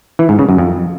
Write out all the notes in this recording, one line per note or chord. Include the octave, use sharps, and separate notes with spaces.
E3
G#2
C#3
F#2
F2